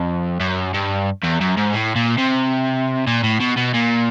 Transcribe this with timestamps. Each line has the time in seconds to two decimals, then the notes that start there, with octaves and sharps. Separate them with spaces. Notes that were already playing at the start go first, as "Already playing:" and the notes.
Already playing: F2
0.40 F#2
0.74 G2
1.23 E2
1.40 F#2
1.57 G#2
1.73 A2
1.96 A#2
2.18 C3
3.07 A#2
3.23 A2
3.40 B2
3.57 B2
3.74 A#2